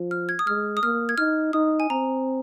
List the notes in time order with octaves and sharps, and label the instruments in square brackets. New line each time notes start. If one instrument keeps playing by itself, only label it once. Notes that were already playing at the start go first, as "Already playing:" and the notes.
Already playing: [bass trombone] F3
[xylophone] F6
G#6
D#6
[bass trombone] G#3 [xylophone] F6
[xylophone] D#6
[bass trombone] A#3 [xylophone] F6
[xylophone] G#6
[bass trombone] D#4 [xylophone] F6
[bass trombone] D#4 [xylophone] D#6
[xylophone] G#5
[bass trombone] C4 [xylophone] A#5